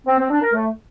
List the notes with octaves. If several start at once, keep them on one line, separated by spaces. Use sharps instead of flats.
C4
C4
D4
A#4
A3